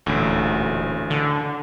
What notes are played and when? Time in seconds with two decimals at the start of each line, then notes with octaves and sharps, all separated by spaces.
0.06 D#1 A1 D2
1.10 D3